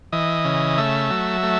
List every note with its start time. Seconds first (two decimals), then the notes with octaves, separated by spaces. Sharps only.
0.12 E3 D#5
0.45 C#3
0.78 A3 E5
1.10 F#3
1.43 A3